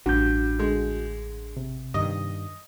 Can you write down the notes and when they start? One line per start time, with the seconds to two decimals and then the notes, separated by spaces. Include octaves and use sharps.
0.06 A1 G2 F#4 G6
0.58 D3 G#3
1.57 C3
1.94 G2 D#3 D#5